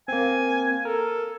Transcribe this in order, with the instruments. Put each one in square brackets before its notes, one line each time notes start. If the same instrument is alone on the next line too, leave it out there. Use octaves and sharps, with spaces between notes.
[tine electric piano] A#3 C4 [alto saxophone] G#5
[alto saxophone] A4 [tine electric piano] A#4